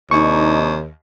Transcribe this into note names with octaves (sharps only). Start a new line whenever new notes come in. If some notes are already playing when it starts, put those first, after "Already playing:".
D#2 C3 D4 D#4 C#6